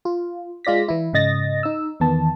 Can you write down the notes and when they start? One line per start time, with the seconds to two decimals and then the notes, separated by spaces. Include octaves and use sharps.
0.05 F4
0.65 G#3 F4 D5 A#6 B6
0.88 E3 E4
1.13 G#2 C#3 D#5 A6 A#6
1.63 D#4 E6
2.00 E2 D#3 B3 A5